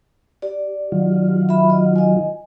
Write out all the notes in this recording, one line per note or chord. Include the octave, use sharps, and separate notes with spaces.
G4 D5
D#3 F#3 F4
E5 B5
D#5
D#5 G#5